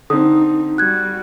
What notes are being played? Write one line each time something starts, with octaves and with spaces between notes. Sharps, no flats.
D3 C4 D#4 D#6
G3 F#4 F#6 G#6